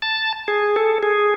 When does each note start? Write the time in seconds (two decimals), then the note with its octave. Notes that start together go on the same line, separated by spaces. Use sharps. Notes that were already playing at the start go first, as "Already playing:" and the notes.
0.02 A5
0.48 G#4
0.76 A4
1.03 G#4